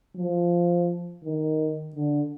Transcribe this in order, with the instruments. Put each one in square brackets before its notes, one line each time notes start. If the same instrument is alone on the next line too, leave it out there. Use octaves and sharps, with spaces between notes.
[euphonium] F3
D#3
D3